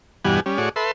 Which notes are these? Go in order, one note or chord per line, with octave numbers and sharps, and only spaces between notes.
E2 G2 B2 G3 F#5 G#5
G3 C#4
A2 F#4 G#4 C#5 D5
A4 B4 E5 C6